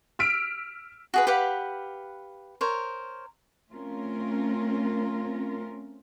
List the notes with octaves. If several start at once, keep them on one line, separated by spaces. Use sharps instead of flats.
E6 F6 B6 D7
F#4 G#4 B4
G4 B4 F5 F#5
A#4 C5 C#5
A3 C4 C#4 F4 A#4